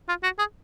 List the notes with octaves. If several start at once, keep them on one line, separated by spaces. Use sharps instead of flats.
F4
F#4
G#4